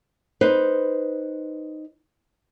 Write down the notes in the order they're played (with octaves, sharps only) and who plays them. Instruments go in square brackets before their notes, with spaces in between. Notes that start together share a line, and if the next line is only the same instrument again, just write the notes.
[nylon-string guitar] D#4 B4 C5